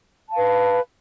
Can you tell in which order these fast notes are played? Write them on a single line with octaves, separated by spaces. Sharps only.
A5 F5 B4